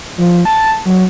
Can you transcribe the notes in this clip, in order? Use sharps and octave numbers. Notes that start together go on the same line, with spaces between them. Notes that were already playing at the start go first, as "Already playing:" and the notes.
F3
A5
F#3